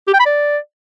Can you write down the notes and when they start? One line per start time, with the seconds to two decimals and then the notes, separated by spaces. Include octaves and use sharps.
0.07 G4
0.13 G5
0.19 B5
0.25 D5